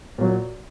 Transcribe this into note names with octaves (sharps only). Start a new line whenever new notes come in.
A#2 F#3